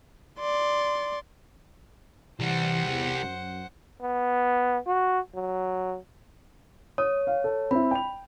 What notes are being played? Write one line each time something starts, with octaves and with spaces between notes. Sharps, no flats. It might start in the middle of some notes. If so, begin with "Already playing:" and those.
D5 C6
C2 E3 G3 C5 F#5
E2
F#2
B3
F#4
F#3
C#5 D#6
F5
A4
C4 E4 B5
G5 F7